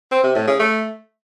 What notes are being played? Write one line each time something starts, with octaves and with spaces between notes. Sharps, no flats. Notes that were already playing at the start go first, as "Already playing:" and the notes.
C4
C3
A2
C#3
A3